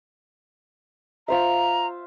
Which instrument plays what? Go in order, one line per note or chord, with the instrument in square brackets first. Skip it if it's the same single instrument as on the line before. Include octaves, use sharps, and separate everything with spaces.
[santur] F4 C5 E5 [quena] A#5